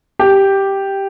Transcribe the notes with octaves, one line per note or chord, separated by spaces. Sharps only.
G4